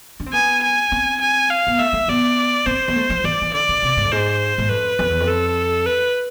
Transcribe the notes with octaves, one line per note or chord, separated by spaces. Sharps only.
D4
C4
B3 G#5
G#5
C4
G#5
F5
B3
A3 E5
A3
B3 D5
C4 C5
B3
A3
F3
E3 D5
E3
D3 D5
D3
C3
G#2
F2
G#2 C5
G#2
F2 B4
F2
E2
F2
A4
B4